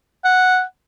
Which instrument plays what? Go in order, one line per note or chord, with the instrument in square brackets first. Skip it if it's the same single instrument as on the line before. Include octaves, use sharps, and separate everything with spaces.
[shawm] F#5